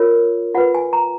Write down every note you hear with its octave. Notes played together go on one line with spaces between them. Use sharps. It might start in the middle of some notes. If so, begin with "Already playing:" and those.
Already playing: F4 A#4 C#5
F4 B4 F#5
G#5
A#5